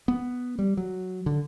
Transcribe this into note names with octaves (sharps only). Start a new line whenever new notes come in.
B3
G3
F#3
D3